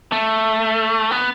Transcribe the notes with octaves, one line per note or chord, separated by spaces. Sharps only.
A3
B3